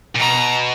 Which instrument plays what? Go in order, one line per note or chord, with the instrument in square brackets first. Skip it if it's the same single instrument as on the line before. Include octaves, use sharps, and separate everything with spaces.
[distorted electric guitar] A#2
[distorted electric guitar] B2 [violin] A#5